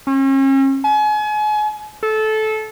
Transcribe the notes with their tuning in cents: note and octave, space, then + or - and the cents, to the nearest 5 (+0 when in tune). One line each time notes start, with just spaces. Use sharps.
C#4 -40
G#5 +35
A4 -20